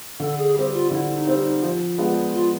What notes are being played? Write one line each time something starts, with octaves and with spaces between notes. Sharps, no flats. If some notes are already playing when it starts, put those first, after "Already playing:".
D3 A4
G#4
G3 C4 G4
F4
D3 E4
E4
D#4
G3 C4
D#4
F3
G#3 B3 D4 F4
F3 F4